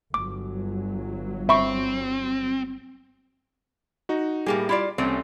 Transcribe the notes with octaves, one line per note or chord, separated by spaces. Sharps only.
G1 F#3 D6
C4 E5 B5 C#6
D#4 F#4
A2 G3 A#3 G4 G#4
E4 F4 D5
C2 E3 A3 C4 C#4